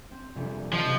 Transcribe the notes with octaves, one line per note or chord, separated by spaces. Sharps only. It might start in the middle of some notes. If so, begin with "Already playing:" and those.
C4
F1 A#1 G3
F3 D#5
B1 C3 F#6